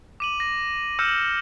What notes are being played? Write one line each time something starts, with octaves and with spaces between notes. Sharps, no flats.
D6 D#7 F#7
A#6
E6 F6 G6 A#6 C#7 E7